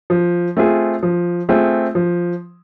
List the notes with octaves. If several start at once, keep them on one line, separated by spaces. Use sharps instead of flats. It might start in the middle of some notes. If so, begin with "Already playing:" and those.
F3
A3 C4 F4 G#4
F3
A3 C4 F4 G#4
F3